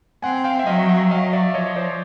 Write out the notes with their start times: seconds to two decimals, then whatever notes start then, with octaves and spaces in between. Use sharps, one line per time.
0.23 C4 F#5 G#5
0.44 F5 G5
0.59 E5
0.67 F#3 D#5 F5
0.89 E5 F#5
1.11 F#3 D#5 F5
1.33 D5 E5
1.54 F3 C#5 D#5
1.76 C5 D5